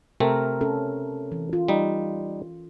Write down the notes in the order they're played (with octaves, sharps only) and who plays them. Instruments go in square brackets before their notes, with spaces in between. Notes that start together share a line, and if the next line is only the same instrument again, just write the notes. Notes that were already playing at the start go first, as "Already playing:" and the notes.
[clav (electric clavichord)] C3 A3 C4 [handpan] A#4
[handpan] C#4 A4
E3
F4
[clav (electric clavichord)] G3 D#4